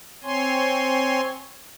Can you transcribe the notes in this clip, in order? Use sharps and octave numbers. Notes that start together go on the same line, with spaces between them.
C4 C#5 G#5 C6